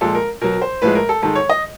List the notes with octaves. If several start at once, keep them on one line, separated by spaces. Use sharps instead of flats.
A#2 F3 G#3 A4
A#4
B2 F#3 A#4
C5
A2 F3 G#3 B4
A#4
A4
G#2 D#3 G#3 A4
C#5
D#5